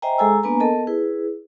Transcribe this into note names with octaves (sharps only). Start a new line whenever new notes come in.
C5 D#5 E5 G5 G#5 A#5
G#3 G#4 A4 G#5 A#5 E6
A#3 B3 D4 B4 G#5 A#5
B3 A4 A#4 D#5 A5
E4 G#4 B4